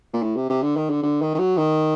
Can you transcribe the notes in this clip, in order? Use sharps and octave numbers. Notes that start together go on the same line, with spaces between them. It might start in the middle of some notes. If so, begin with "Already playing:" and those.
A#2
A2
C3
C3
D3
D#3
D3
D3
D#3
D#3
F#3
D#3